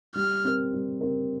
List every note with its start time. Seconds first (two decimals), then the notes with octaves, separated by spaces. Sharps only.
0.15 G3 F6
0.45 C4 A#4
0.73 G3
1.01 C4 A#4